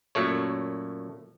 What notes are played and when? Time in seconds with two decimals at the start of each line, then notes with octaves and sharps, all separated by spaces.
0.15 F#2 A#2 A3 C#5